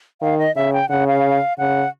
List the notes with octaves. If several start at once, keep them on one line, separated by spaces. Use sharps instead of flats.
D#3 F5
D#5
C#3 E5
G5
C#3 F#5
F5
C#3 F#5